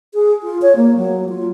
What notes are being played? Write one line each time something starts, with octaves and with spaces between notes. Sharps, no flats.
G#4
F4
C#5
A#3
F#3
F4